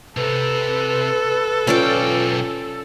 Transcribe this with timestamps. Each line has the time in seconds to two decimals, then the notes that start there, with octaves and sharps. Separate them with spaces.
0.17 C3 A4 B4
1.67 B1 C#4 F4 D5 G5